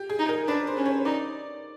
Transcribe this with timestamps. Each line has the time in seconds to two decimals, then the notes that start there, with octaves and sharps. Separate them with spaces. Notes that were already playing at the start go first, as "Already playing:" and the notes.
Already playing: G4
0.10 G#4
0.19 D#4
0.29 A#4
0.48 D4 B4
0.67 C5
0.77 C#4
0.86 C#5
1.05 D#4 D5